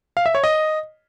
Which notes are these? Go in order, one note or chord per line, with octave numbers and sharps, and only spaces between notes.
F5
E5
C#5
D#5